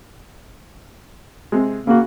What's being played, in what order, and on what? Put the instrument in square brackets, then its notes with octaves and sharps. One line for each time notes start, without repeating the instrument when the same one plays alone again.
[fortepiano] C3 G#3
[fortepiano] C#3 F#4 [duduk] A#3